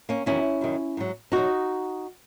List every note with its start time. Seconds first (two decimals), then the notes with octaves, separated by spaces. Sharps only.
0.09 A#3 C#4
0.26 E2 D#3 F#3 C#4 E4
0.61 F#2 D#3 F#3
0.97 G#2 F#3
1.32 E2 B2 F#3 D#4 F#4